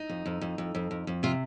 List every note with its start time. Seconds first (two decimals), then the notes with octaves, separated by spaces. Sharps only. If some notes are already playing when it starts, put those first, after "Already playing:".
Already playing: D#4
0.09 F2
0.26 F2
0.41 F2
0.58 F2
0.75 F2
0.91 F2
1.07 F2
1.23 C3 F4